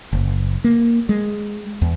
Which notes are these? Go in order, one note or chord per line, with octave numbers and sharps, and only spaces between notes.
F#1
A#3
G#3
E2